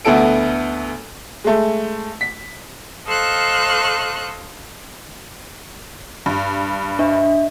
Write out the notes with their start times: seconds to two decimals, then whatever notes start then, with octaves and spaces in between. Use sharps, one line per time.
0.05 D2 B3 E4 A4 D7
1.44 G#3 A3
2.21 B6
3.06 A4 C5 D#5 F5 C#6 F#6
6.26 G2
6.99 D4 D#5 E5